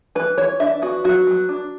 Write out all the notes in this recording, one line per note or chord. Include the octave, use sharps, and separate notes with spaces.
E3 B4
E3 C#5
D4 E5
B3 F#4
F#3 F#4
F#3
D4